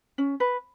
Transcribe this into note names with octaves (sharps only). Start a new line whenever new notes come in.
C#4
B4